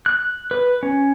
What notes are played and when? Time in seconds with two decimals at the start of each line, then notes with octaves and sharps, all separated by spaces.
0.06 F#6
0.51 B4
0.83 C#4